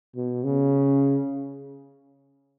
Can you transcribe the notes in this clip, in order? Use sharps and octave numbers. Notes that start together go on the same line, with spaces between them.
B2
C#3